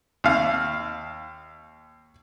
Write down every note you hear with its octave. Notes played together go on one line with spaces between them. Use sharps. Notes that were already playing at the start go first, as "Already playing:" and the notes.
D#2 F5